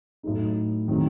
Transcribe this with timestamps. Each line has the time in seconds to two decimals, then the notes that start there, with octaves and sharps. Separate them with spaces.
0.23 A2 F#3 A3 D#4
0.88 D#3 F#3 C4 E4 G#4